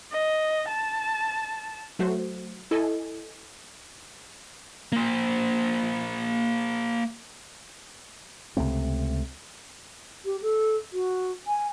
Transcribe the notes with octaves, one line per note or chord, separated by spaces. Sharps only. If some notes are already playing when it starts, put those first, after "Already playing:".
D#5
A5
F#3 A3 F#4 C5
E4 A4 D#5 G#5
A#3 C5
C#2 C3 A3 C4
G4
A4
F#4
G#5